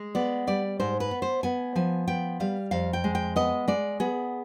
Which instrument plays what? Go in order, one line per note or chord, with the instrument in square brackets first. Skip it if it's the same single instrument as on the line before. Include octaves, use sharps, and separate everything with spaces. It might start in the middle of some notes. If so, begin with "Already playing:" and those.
Already playing: [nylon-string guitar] G#3
B3 D5
G3 D5
G#2 C5
B4
B3
C5
B3 G#5
F3 G#5
B3 G5
G3 F5
F2 F5
G5
G#3
G5
B3 D#5
G#3 D5
B3 G#4